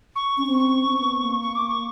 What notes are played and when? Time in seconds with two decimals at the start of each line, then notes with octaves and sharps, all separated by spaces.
0.16 C#6
0.37 C#4
0.47 C4
0.58 C#6
0.85 C#4
0.92 C4
1.00 B3
1.20 A#3
1.41 C#6
1.55 D6
1.69 C#6